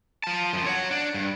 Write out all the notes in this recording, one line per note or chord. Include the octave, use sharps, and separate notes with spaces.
F4 A5
F#2 F3
C#5 F#5
D4
G2